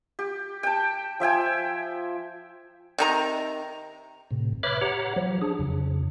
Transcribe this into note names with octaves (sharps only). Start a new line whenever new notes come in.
G4
G5 A5
F3 E5 G5 G#5
C3 D#3 A#5
A2 C3
B4 C#5 E5 B5 D6 F6
G4 C#5 F#5 A#5
F3 F#3
D4 G#4
F2 C#3